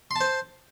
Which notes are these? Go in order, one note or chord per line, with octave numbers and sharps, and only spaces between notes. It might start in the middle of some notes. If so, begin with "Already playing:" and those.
C5 A5 C6